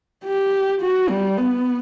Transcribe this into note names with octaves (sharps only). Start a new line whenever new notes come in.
G4
F#4
G3
B3